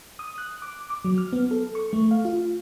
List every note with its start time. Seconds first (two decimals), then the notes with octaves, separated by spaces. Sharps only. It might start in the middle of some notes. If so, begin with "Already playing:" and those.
0.19 D#6
0.38 F#6
0.62 D6
0.90 D6
1.05 F#3
1.18 F6
1.33 B3
1.51 A4
1.75 C#6
1.93 A3
2.11 F5
2.25 F4